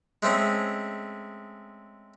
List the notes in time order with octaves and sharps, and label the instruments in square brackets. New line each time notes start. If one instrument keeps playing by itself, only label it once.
[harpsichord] G#3 A3 C4 C#4